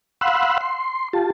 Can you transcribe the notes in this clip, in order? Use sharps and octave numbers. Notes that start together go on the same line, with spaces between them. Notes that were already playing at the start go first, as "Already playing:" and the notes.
F5 F#5 B5 C6 E6 F#6
C6
F4 G4 A5